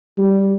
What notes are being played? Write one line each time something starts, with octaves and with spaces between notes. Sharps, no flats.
G3